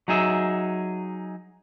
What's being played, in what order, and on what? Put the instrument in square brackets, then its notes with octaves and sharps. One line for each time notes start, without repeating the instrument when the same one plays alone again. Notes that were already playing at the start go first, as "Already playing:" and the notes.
[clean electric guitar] F#3 D#4 G#4 E5